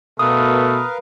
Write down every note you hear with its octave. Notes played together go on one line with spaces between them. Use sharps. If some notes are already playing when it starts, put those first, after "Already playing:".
B2 A3 A#4 B4 F5 D#6